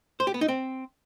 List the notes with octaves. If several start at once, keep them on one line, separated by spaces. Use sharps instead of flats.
C5
G4
B3
D#4
C4